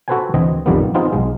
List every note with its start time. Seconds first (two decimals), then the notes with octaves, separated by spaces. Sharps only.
0.08 F#4 A4 B4 C5 G5 G#5
0.34 D2 E3 C4 D#5
0.66 A#1 F2 D#3 G3 A#3 B3
0.94 B3 C4 D#4 F4 G#4
1.13 B1 G#3